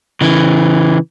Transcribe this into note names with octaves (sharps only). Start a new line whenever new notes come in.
C#3 E3